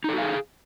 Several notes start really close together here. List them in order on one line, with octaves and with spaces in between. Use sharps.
D#4 A4 F#4 F5 G#4